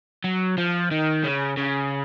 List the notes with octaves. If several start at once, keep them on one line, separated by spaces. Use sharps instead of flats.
F#3
F3
D#3
C#3
C#3